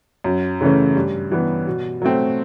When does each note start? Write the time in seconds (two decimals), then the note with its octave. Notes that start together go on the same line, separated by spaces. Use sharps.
0.24 F#2
0.61 C#3 E3 A3 C#4
0.95 G2
1.31 E3 G3 B3
1.67 B2
2.02 F#3 A3 C4